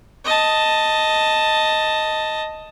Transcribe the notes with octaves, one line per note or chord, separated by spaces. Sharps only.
D#5 A5